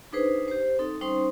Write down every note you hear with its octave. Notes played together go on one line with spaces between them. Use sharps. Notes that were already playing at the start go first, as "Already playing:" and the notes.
D4 D#4 G#4 B4 C5
G4 C5
C4 D#4 A4
G3 C#4 D#4 C5 C6